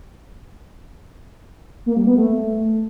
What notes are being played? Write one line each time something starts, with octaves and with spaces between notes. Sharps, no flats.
A#3
G3
B3
A3